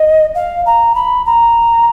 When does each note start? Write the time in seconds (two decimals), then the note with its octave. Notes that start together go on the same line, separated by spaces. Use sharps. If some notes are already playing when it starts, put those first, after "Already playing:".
Already playing: D#5
0.35 F5
0.66 A#5
0.95 B5
1.26 A#5